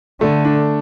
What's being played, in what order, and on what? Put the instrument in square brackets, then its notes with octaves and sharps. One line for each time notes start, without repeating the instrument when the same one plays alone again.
[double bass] D3 [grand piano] A3
[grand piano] D4